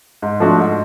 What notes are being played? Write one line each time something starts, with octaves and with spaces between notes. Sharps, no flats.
G#2
F3 A3 D4 F#4
G#2